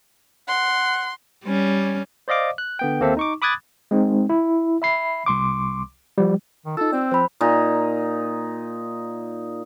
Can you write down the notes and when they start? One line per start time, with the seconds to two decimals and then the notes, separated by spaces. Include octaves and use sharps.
0.48 F#5 C6
1.45 G3 C#4
2.28 C5 D5 D#5 F5 D6
2.58 F#6
2.79 D3 B3 G5
3.00 D#2 A#3 C4 A4 C5 E5
3.17 D#4 C#6 D6
3.42 B5 D6 D#6 F#6 G#6 A6
3.91 G#3 C4 D#4
4.30 E4
4.82 E5 B5 C7
5.26 C2 C6 D6
6.18 F3 G3
6.66 D#3
6.77 D#4 F4 A4 E6
6.93 C4 D5
7.12 F3 C5 B5
7.41 A#2 D#4